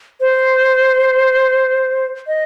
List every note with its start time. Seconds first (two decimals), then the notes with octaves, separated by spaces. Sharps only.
0.21 C5
2.27 D#5